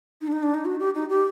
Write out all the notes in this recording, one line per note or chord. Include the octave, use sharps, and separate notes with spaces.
D#4
D4
D#4
D4
D#4
F#4
G4
D#4
G4